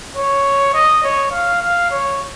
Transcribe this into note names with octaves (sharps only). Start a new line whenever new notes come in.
C#5
D#5
C#5
F5
F5
C#5